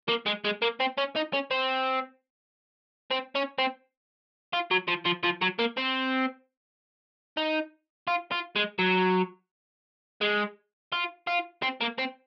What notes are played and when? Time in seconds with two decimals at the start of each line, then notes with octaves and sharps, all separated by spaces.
0.09 A#3
0.26 G#3
0.45 G#3
0.62 A#3
0.80 C4
0.98 C#4
1.16 D#4
1.33 C#4
1.51 C4
3.11 C4
3.35 C#4
3.58 C4
4.53 F4
4.71 F#3
4.88 F3
5.06 F3
5.24 F3
5.42 F#3
5.59 A#3
5.77 C4
7.37 D#4
8.08 F4
8.31 F4
8.56 G#3
8.79 F#3
10.21 G#3
10.92 F4
11.27 F4
11.62 C4
11.81 A#3
11.99 C4